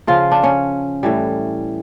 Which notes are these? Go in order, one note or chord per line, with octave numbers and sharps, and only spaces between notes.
C#3 F3 F4
D4
C#4
A2 E3 G3